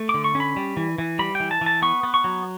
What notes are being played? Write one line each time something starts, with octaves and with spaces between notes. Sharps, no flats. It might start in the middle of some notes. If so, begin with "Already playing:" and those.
Already playing: A3
D6
D3
C#6
C#4
B5
G3
E3
E3
G3 B5
G5
E3
A5
E3
A5
B3 C#6
B3
C#6
F#3